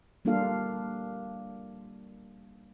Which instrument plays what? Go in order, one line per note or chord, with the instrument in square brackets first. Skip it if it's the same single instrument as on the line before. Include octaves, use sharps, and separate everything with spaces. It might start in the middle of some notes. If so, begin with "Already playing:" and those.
[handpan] G3 A#3 D4 F4 A4 F5